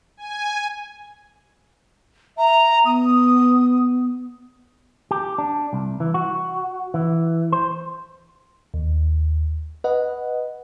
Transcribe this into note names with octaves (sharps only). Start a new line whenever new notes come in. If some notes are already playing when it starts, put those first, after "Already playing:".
G#5
E5 A#5
B3 D#6
G4
D4
C2
E3
F#4
E3
C5
D#2
B4 D#5 F#5